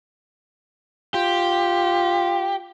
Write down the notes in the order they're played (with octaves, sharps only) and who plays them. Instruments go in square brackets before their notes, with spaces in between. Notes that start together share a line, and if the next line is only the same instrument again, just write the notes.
[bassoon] F4 [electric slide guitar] G4